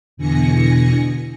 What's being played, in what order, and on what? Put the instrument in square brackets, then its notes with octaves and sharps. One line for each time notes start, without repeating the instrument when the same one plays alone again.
[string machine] E2 B2 D3 G#5 A#6 C#7